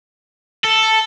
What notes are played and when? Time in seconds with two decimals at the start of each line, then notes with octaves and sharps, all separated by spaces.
0.64 A4